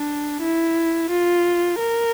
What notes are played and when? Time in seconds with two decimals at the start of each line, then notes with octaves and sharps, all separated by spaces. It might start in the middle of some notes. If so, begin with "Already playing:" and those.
Already playing: D4
0.42 E4
1.10 F4
1.80 A#4